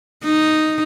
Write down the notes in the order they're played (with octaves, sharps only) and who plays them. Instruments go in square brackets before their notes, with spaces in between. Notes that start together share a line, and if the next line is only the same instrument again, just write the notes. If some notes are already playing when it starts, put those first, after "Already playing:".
[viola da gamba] D#4